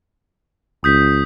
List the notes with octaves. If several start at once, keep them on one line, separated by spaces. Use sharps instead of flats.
C#2 D#6 G6 B6